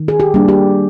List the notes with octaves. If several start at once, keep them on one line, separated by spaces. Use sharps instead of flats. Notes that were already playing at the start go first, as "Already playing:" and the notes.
Already playing: D#3
G#4
G4
G3 A#3 D4
G4